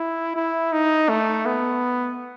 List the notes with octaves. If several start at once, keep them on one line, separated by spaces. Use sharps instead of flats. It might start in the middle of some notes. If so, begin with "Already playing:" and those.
Already playing: E4
E4
D#4
A3
B3